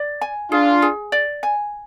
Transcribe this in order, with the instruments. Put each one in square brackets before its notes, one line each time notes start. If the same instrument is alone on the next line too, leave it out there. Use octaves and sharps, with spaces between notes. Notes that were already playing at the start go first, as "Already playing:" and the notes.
Already playing: [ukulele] D5
G#5
[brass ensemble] D4 F4 [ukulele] G#4
[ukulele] G#4
D5
G#5